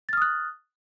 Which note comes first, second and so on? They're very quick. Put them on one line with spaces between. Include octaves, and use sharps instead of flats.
A6 F6 D#6 F#6